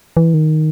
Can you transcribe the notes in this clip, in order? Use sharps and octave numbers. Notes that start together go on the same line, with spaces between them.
E3
D#3